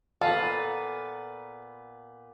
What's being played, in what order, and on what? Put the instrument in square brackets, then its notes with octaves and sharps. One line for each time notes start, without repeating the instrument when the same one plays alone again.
[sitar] A#2 B3 [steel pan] F4 F5 [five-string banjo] A4